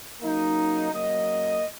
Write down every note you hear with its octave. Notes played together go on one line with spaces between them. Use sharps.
C#3 F#3 A#3 D#4
C#3 F#3 A#3 D#5